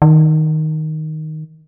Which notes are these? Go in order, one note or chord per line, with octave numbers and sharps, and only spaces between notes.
D#3